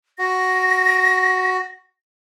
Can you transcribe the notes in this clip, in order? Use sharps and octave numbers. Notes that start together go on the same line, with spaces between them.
F#4 A#6